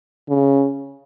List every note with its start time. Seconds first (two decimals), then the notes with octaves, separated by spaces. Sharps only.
0.29 C#3